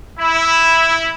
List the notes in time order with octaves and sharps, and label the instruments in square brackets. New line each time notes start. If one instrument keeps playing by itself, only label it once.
[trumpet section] E4